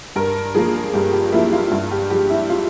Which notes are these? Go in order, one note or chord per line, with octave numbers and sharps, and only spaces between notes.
G2 A#4
F3 A#3 G#4
G2 G4
G4
F3 A#3 E4
F4
G2
G4
F3 G#3 G4
E4
F4